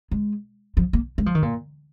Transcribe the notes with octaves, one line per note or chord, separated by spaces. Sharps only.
G#3
F3
A#3
G#3
F3
D#3
A#2